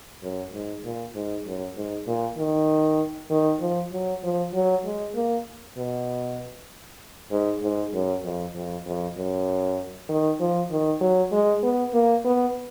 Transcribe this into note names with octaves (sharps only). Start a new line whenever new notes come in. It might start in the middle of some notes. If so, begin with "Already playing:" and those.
F#2
G#2
A#2
G#2
F#2
G#2
A#2
D#3
D#3
F3
F#3
F3
F#3
G#3
A#3
B2
G#2
G#2
F#2
F2
F2
F2
F#2
D#3
F3
D#3
F#3
G#3
B3
A#3
B3